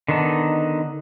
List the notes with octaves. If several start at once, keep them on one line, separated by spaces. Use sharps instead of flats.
D3 D#3 B3 D#4 A5